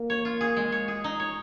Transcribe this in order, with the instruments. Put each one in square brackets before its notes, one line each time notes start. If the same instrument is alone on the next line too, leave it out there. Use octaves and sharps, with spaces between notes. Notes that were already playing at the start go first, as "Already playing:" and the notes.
Already playing: [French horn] A#3
[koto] C#5
F4
G#4
G#3
C#5
G#4
D#4
C#5